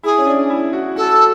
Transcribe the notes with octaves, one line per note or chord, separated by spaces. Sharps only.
E4 G#4
C#4
D4
E4
F#4
F#4 A4